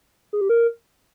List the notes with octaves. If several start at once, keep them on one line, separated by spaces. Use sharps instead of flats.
G#4
G4
A#4